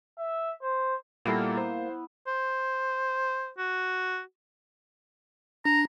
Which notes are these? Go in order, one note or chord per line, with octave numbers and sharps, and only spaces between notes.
E5
C5
A#2 G3 A#3 B3 E4 A4
C5
C5
F#4
D4 A#5